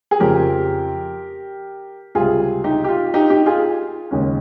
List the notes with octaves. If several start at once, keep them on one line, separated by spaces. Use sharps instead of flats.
G#4
F2 C#3 F3 G4 A#4
C#2 C3 G3 F4 G#4
D#4 G4
G4
F4
D#4 G4
D#4 G4
F4 G#4
D#2 C#3 G#3 C#4